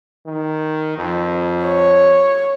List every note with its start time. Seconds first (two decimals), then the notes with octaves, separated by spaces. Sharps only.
0.26 D#3
0.98 F2
1.65 C#5